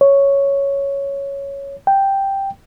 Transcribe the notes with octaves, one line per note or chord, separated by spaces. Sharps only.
C#5
G5